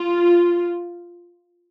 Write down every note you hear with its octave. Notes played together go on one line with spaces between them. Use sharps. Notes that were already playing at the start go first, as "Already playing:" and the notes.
Already playing: F4